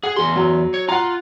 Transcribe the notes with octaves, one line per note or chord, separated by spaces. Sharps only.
G#4 F#5
E2 G#4 C6
F#3
C#5
F4 F#5 A#5